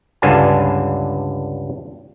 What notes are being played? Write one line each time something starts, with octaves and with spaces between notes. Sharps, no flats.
C#2 G2 D3 F5 G#5 A5